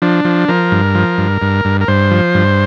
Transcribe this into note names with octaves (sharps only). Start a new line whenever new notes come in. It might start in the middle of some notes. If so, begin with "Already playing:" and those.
F3 D4
F3
F3 A#4
G2
F3
G2
G2
G2
A#4
G2 C5
F3
G2